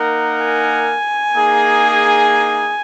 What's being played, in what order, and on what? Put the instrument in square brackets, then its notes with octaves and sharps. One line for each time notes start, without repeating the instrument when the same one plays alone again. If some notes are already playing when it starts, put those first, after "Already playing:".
Already playing: [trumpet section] A#3 D#4 A#4 F#5
[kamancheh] G#5
[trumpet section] A#3 D#4 G#4